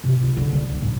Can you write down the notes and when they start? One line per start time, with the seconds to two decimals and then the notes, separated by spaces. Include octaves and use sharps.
0.04 C3
0.23 F4
0.37 D3
0.52 G3
0.68 D2
0.82 A2